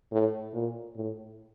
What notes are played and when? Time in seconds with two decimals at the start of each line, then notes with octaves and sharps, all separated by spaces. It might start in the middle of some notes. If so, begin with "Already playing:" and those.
0.12 A2
0.54 A#2
0.96 A2